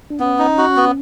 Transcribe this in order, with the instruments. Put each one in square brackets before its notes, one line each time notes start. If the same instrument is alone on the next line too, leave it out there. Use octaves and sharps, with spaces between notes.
[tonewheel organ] D4
[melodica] B3 [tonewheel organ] C#4
[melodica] D#4
F#4
B3